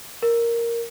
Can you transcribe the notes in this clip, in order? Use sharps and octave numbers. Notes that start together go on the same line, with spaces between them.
A#4